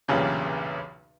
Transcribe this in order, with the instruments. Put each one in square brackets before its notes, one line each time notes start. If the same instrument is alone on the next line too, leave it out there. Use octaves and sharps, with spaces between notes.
[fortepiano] B1 E2 G2 A#2 C#3 F4